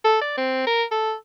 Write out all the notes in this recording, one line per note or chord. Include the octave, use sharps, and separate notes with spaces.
A4
D5
C4
A#4
A4